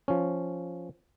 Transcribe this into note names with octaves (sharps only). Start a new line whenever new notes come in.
F3 C#4